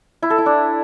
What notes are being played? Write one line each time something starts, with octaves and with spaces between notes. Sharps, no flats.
E4
A4
E4
D4